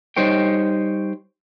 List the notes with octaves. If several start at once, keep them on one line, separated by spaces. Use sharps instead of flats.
G3 D#4 C5 C#5 G5